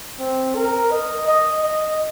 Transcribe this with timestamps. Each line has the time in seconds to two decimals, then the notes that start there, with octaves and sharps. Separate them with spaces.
0.19 C4
0.55 A#4
0.91 D#5
1.28 D#5
1.63 D#5